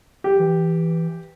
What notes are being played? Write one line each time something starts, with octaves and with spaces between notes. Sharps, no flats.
G4
E3